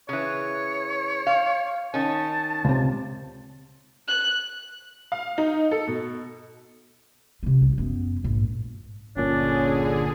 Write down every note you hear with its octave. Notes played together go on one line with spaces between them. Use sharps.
C#3 E3 C#5
F5
D#3 C#4 A5
C#2 C3
F#6
F5
D#4
A4
B2
C3 C#4
C2
F#2 B3
A#1 G#2
G1 A#2 D3 C#4 D4 G#4